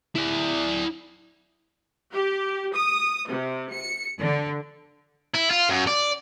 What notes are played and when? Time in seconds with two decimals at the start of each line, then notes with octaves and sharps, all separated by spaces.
0.15 E4 D5
2.13 G4
2.73 D#6
3.28 C3
3.72 C#7
4.19 D3
5.34 E4
5.50 F4
5.69 F#2
5.87 D5